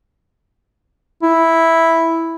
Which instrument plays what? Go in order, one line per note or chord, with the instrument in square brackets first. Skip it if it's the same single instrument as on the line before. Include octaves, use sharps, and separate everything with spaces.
[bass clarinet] E4